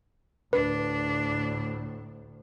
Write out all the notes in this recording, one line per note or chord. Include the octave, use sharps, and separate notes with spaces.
D2 A2 D4 B4